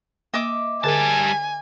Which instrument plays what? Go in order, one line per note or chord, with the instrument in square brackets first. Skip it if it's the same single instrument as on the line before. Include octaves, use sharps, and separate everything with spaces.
[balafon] A#3 [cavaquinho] D#5 E5 D6
[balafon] D3 G#4 A#4 [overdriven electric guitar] G3 A5 [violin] G#5